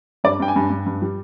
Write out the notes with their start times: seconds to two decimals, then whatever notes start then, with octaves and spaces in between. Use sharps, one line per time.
0.24 G2 D5
0.40 G2 G5
0.48 G#5
0.56 G2
0.70 G2
0.86 G2
1.02 G3